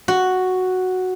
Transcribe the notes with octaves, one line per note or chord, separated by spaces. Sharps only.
F#4